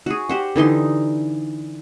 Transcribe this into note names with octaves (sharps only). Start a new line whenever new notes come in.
F#4 G#4
G4 C5 F#5
D3 E3 D#4 C6